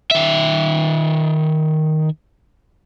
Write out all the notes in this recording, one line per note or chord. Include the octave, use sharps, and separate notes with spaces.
D#3 E5